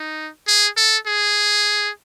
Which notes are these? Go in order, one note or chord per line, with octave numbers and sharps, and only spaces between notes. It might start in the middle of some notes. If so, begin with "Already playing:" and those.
Already playing: D#4
G#4
A4
G#4